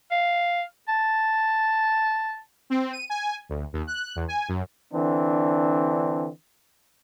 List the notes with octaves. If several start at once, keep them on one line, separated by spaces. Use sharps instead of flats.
F5
A5
C4
D#7
G#5
D2
D#2
F#6
E2
G#5
F#2
D3 E3 C4 D4